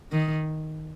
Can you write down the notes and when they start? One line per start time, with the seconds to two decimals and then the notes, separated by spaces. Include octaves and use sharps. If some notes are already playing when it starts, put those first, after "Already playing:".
0.12 D#3